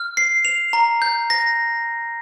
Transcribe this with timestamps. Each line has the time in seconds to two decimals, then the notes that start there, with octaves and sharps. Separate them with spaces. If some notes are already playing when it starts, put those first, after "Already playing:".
Already playing: F6
0.17 C7
0.45 F7
0.73 A#5
1.02 G6
1.30 A#6